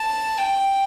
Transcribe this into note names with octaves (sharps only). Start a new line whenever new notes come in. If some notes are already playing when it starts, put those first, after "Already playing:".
Already playing: A5
G5